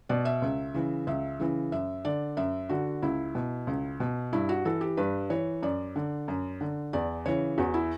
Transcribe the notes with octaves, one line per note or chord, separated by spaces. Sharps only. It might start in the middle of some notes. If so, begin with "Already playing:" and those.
B2 D5
E5
C#2
C#3 E3
C#2 E5
C#3 E3
F#2 E5
D3 D5
F#2 E5
D3 F#4
C#2 E4
B2
C#2
B2
G2 E4
F#4
E3 A4
G4
G2 B4
E3 C#5
F#2 D5
D3
F#2
D3
E2 D5
C#3 E3 C#5
E2 F#4
E4